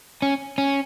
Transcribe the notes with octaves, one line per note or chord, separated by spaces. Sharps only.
C#4
C#4